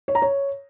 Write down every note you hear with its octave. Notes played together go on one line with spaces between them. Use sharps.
C#5
A#5
C#5